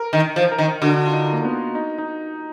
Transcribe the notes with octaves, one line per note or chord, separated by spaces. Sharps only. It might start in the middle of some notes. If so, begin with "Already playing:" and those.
Already playing: A#4
D#3
F3
A#4
D#3
D3 F#4
F4
D#4
A#3
B3
D#4
D#4